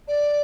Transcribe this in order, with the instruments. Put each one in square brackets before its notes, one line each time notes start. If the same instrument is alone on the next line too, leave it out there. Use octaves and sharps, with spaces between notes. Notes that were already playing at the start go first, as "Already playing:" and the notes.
[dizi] D5